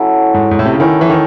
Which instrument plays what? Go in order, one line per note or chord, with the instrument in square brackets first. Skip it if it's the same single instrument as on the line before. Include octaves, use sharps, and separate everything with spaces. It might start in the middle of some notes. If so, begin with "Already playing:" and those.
Already playing: [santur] F#3 C#4 E4 A4
[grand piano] G#2
G#2
A2
C3
C#3
[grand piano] D#3 [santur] A3 C#4 E4
[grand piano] E3
D#3